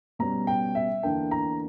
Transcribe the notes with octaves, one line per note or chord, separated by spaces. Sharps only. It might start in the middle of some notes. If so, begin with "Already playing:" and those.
B2 G3 C#4 A#5
G5
E5
E2 D3 A#3 D4 G5
A#5